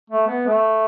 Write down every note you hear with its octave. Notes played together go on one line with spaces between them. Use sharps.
A3
B3
A3